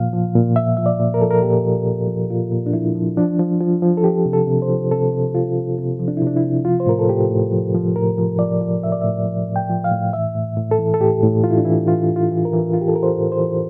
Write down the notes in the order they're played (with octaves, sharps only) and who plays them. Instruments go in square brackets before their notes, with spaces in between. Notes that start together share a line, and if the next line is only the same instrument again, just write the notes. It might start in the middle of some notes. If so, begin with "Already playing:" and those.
Already playing: [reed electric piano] A#2 F3 F5
F3
A#2
A#2 E5
F3 E5
D5
A#2
A#4
F3 A4
A#4
A#2 G4
F3
A#2
F3
A#2 F4
A#2
D4
F3 E4
F3
F3 D4
F3
F3 F4
F3
A4
F3 G4
C3
A4
C3
C5
F3
C3 A4
C3
C3 F4
C3
C3 C4
F3
D4
E4
C3 D4
E4
C3
F3 F4
C5
A2 A#4
A4
A2 G4
A2
F3
F3
A2 A#4
F3
F3 D5
F3
A2 E5
D5
A2 E5
F3
A2
G5
F3
F5
A2
E3 E5
A2
A2
A4
E3
A4
A2 G4
A2
E3 F4
E4
D4
E3 E4
E3 F4
A2
F4
E3
A#4
E3
E3 F4
G4
A4
E3 A#4
C5
A2
C5
E3